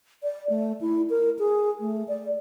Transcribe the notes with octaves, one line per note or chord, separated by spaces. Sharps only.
D5
A3
E4
A#4
G#4
A3
D5